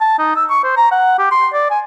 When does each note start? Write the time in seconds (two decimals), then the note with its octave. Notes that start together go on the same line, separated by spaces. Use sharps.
0.01 A5
0.19 D#4
0.36 E6
0.50 C#6
0.63 C5
0.77 A#5
0.91 F#5
1.18 G4
1.31 C6
1.53 D5
1.70 G#5